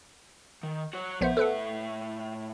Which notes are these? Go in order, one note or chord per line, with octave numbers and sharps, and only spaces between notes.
D#3
F#4 C#5
A#1 A2 B3 C5 E5
A4 B4 F#5